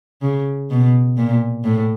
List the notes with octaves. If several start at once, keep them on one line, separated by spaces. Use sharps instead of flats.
C#3
B2
A#2
A2